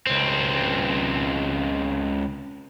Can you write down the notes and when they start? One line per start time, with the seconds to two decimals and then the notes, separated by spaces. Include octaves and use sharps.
0.07 C#2 C4